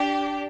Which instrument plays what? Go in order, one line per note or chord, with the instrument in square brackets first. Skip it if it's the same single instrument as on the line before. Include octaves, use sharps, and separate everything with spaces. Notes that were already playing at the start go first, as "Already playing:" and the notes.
Already playing: [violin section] D4 G4